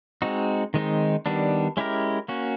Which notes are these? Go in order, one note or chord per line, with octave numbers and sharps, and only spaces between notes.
G#3 C4 D#4 F#4
D#3 G#3 C4 D#4
D#3 G3 B3 D4
G#3 C#4 E4 G4 A#4
A#3 C#4 F#4